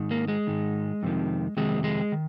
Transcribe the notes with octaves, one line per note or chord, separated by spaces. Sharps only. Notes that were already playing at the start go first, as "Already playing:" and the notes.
Already playing: G#2 D#3
A#3
G#3
G#2 D#3
F2 C3 D#3
F2 C3 D#3 G#3
G#3
D#3